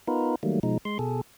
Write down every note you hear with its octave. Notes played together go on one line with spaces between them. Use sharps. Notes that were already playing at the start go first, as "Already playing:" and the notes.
B3 D#4 F4 A#4 B4
D#3 F#3 G3 A3 A#3
B2 F3 G#3 D#4
G#3 C6
B2 G#4 A4